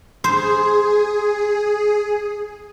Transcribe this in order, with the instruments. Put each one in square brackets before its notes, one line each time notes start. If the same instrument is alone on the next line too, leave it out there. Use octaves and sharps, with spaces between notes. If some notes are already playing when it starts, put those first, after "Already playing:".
[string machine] G#4 [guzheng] C5